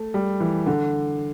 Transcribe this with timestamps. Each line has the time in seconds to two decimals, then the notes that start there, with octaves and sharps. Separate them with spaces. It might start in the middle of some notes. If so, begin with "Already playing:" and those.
Already playing: A3
0.14 G3
0.40 E3
0.66 D3